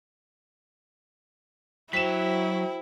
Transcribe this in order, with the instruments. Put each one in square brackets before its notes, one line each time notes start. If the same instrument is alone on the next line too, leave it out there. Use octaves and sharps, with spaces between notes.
[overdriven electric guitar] F#3 [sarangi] E4 [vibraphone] F#4 C5 G5 [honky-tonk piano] B6 E7